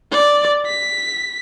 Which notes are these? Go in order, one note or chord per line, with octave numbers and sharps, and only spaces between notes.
D5
B6